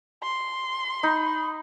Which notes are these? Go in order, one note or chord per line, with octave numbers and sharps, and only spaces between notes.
C6
D#4 B5